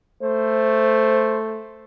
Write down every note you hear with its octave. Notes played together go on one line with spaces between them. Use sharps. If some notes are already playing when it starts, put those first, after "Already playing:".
A3 C5